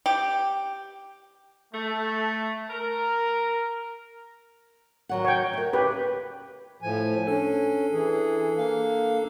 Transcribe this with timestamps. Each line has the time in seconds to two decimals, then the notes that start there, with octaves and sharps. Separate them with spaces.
0.06 G4
1.74 A3
2.70 A#4
5.09 D#3 F#3 F#5
5.25 C#5 G5
5.53 A#4 E5
5.73 C#3 G4 B4
6.82 A2 F3 G#5
7.27 C#4 D4 A4
7.92 E3 G#4
8.58 A#3 F5